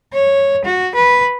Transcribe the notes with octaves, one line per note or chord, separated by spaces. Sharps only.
C#5
F#4
B4